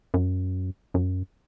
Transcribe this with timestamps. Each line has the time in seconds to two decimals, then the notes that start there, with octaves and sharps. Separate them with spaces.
0.14 F#2
0.94 F#2